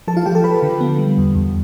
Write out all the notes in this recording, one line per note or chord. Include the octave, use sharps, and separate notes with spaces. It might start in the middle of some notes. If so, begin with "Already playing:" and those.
F3 A4 A5
F4 F5
F3 G4 G5
A4 A5
F3 B4 B5
D3
B3
G3
E2
E2